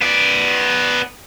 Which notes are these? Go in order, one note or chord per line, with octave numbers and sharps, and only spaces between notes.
B3 D5